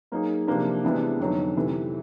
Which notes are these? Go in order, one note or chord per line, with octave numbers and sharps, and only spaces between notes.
F#3 A#3 D#4 G#4
C3 F3 A#3 D4
C3 E3 G#3 B3 D4
F2 D3 F#3 B3 D#4
C3 E3 A3 C4